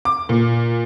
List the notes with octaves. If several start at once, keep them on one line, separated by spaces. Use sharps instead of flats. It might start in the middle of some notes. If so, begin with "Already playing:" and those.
D6
A#2